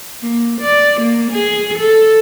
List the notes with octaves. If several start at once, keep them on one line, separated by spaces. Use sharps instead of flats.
A#3
D5
A#3
G#4
A4